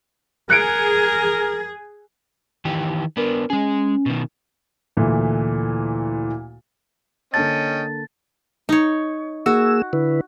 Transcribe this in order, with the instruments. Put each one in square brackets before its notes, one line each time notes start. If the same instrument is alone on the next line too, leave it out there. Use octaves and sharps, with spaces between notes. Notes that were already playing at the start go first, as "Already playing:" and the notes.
[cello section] G#4 [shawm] A#4 [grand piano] F#6 C#7 D7
[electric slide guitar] D#3 E3 G4
[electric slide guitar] B3 D4 [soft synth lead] A#4
[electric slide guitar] G#3 G#4 [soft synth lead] C#4
[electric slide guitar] B2 D#3
[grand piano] D2 A#2 E3 A3
[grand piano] D3 A#3 A5 [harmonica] C#4 D#5 G5 [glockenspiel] A6
[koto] D#4 C#5
[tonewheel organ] A#3 G#4 E6 [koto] F#4
[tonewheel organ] D3 E4 B4